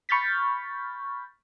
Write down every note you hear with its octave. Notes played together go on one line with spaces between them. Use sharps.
B5 C#6 F6 G6 A6 B6